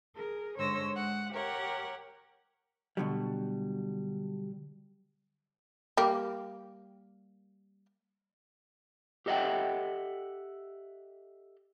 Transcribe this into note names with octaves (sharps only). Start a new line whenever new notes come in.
G#4 A#4
G#2 D3 C#5 C6 E6 A#6
G#3 F#5
G4 A#4 C#5 F#5
B2 D3 F#3 G3
G3 A#3 G4
G4 A4 D#5 E5 F#5 G5